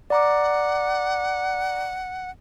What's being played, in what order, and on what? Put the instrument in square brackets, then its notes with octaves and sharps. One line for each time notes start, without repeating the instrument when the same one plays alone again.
[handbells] D5 A#5 D6 [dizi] F#5